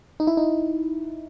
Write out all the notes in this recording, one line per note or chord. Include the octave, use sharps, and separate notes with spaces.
D#4
E4
D#4